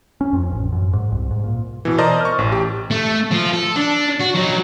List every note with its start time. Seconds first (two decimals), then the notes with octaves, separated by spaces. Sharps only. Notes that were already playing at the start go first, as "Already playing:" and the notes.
0.21 C#4
0.33 F2
0.52 A1
0.72 F#2
0.93 G#2
1.12 C2
1.31 G#2
1.44 A#2
1.85 B2 E3
1.98 A#4 C5 D5 D#5 A5 A#5
2.21 C#6 F6
2.39 A1
2.52 G4
2.91 A3
3.32 F3 F4
3.54 A4
3.76 D4
4.20 F#4
4.35 F#3 D#4